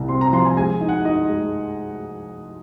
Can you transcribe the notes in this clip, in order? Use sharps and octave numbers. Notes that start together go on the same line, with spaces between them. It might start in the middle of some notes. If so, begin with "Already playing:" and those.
Already playing: C2 C3
C4 C6
A#5
F3 C6
G#5
G#3 G#5
D#4
F#5
D#4 D#5
G#3